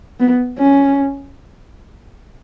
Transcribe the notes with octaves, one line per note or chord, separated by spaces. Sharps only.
B3
C#4